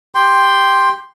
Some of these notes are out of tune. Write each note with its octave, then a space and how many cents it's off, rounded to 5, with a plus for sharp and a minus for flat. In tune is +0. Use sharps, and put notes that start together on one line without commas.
G4 +0 G5 +10 C6 +0